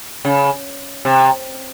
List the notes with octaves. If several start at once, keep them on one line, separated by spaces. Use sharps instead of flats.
C#3
C3